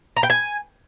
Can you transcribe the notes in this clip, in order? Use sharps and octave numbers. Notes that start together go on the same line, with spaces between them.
A#5
G5
G#5